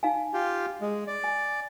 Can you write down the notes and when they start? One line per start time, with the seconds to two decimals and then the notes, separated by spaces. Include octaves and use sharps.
0.03 D#4 F5 G#5
0.34 F4 G4
0.81 G#3
1.07 D5
1.24 G#5